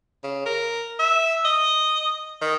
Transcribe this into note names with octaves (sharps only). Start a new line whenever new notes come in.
C#3
A#4
E5
D#5
D#3